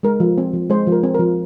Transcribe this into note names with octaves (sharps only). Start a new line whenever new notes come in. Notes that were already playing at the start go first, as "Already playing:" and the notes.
G#3 A#4
F3
C4
F3
G#3 C5
F3
A#4
C4
A#4
F3